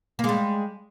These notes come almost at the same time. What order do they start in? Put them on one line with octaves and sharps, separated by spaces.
A#3 G#3 G3